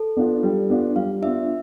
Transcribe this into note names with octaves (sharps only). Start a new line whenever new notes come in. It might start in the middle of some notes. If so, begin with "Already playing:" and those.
Already playing: A4
B3 D4 F4
G3
B3 D4 F4
G3 F5
B3 D4 F4 E5